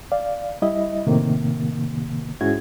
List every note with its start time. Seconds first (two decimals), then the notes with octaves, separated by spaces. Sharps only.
0.12 D5 F5
0.62 G3 E4 D#5 E5
1.07 A2 C3 D#3 A#3
2.41 G#2 C#4 E4 F#4 G#4 G#6